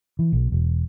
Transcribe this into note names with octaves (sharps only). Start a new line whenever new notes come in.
E3
B1
E1